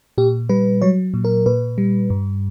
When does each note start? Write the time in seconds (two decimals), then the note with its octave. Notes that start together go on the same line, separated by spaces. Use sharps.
0.18 A#2 G4
0.49 G3 B4
0.82 F#3 C#5
1.14 A#2
1.25 A#4
1.46 A#2 B4
1.78 G3
2.10 G2